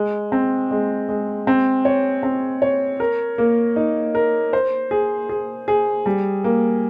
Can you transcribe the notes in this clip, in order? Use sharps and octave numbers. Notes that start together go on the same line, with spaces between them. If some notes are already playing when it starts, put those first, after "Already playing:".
Already playing: G#3
C4
G#3
G#3
C4
C#5
C4
C#5
A#4
A#3
D#4
A#4
C5
G#4
G#4
G#4
G3
A#3